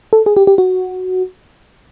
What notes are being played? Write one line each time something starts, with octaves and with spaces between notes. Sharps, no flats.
A4
G#4
G4
G4
F#4